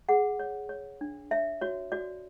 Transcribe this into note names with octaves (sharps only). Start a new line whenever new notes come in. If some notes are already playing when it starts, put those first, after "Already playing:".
G#4 F#5
C#5
C#5
D4
C#5 E5
F#4 C#5
F#4 D5